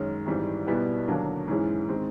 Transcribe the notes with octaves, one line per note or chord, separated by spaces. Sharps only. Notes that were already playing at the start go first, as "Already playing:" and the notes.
Already playing: F#2 D#3 G#3 C#4
G#1 G#2 E3 G3
B1 B2 G3 B3 E4
D#2 D3 F#3 A#3 D4
G#2 E3 G#3 C#4 E4
D#3 G#3 C4